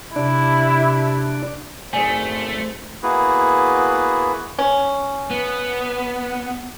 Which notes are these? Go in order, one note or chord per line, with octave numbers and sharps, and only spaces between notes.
C3 D4 E4
G#1 F#2 A3 G#4 C5 D5 G#5
A#3 B3 E4 F#4 G#4 B4
C#4
B3